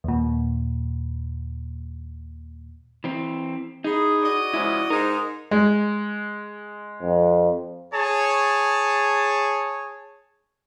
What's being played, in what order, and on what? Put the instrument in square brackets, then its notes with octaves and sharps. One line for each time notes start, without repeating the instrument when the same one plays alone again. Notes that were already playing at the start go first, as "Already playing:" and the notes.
[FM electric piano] D#2 A#2
[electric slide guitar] E3 C4
[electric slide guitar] D#4 [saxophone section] E4 G#4
[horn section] F#4 D5 D#5
[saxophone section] C#3 F3 G#3 [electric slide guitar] E4
[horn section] G#2 [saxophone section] G#3 D#4 [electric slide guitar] A#4
[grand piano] G#3
[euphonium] F2
[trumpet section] G#4 C#5 A5